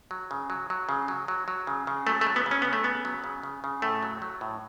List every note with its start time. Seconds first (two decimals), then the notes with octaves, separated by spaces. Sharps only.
0.11 F#3
0.31 C#3
0.50 F#3
0.70 F#3
0.89 C#3
1.08 F#3
1.28 F#3
1.48 F#3
1.67 C#3
1.87 C#3
2.07 F#3 A3
2.21 A3
2.27 F#3
2.36 B3
2.46 C#3
2.51 C#4
2.62 C#3 B3
2.73 A3
2.84 C#3 B3
3.05 F#3
3.24 C#3
3.43 C#3
3.64 C#3
3.82 A2 A3
4.03 F#3
4.22 F#3
4.41 A2